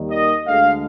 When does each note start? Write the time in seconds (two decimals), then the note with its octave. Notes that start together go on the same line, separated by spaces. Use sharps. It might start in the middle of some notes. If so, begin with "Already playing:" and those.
Already playing: D#2 D#3 G3
0.11 D#5
0.46 D2 D3 G#3 F5